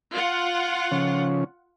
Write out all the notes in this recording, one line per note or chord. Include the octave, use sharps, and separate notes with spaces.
F4 F#5
C#3 F3 C#4